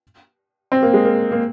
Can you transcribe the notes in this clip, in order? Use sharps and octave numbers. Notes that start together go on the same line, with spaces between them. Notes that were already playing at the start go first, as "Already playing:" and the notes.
C4
A#3
G#3
A#3
A#3